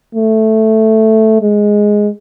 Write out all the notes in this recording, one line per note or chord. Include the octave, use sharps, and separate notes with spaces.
A3
G#3